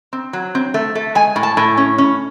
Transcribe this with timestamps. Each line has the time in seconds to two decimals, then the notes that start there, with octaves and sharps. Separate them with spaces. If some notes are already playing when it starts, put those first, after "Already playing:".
0.13 C4
0.33 F#3
0.55 C4
0.74 A3
0.95 A3
1.15 G#3 G#5
1.36 A2
1.43 A5
1.57 A2
1.77 C#4
1.98 C#4